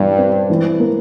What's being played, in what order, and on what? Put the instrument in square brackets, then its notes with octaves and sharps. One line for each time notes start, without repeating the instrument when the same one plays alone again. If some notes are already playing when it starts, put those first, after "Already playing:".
Already playing: [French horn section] G2 [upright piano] E3 G3
[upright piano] C4
E3
A#3